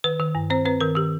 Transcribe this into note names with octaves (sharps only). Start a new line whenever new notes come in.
D#3 B4
D#3
G2
C4 C5
C4 B4
D#3 A#4
D#3 G4